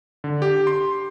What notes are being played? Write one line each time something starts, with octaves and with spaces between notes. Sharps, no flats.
D3
G4
C6